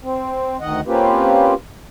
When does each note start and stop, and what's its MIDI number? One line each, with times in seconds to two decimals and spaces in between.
0.03 0.57 60
0.61 0.80 38
0.61 0.80 51
0.61 0.80 75
0.61 0.80 78
0.87 1.54 58
0.87 1.54 60
0.87 1.54 61
0.87 1.54 65
0.87 1.54 67
0.87 1.54 71